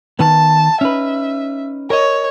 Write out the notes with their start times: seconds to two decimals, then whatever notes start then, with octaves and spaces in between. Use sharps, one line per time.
0.19 D#3 B3 A5
0.81 C#4 D#4 B4 E5
1.90 A#4 C#5 D#5